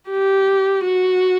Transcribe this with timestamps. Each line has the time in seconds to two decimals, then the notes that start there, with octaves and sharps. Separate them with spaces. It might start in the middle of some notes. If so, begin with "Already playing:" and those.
0.10 G4
0.85 F#4